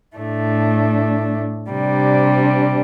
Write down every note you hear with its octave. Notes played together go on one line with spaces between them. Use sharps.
A2 A3 D4
C3 G3 D4